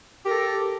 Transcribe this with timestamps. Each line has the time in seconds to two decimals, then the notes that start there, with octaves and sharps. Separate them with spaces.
0.25 G4
0.27 A#4
0.30 A4